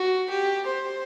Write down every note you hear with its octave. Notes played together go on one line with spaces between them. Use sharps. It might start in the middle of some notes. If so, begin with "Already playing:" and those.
Already playing: F#4
G4
C5